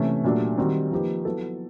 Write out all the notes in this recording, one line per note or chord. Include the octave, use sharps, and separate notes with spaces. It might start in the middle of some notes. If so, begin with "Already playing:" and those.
Already playing: C3 E3 A3 C#4
A#2 F#3 A3 D4 G4
D#3 G3 C4 D#4 F#4
F3 A#3 D#4 G4 B4
F#3 B3 E4 A4